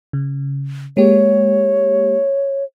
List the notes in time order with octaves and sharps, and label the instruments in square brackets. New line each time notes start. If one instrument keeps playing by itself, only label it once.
[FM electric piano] C#3
[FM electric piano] G#3 A#3 G4 [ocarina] C#5